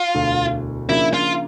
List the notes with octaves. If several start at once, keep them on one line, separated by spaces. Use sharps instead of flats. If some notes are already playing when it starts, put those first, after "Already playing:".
Already playing: F4
E1 D2 D3
C#3 F3 A#3 D4 E4
F4